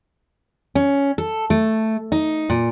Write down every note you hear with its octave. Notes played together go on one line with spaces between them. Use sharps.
C#4
A4
A3
D#4
A#2